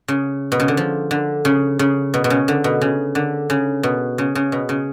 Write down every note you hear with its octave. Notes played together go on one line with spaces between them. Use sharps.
C#3
B2
C#3
D3
F3
D3
C#3
C#3
B2
B2
C#3
D3
B2
C#3
D3
C#3
B2
C#3
C#3
B2
C#3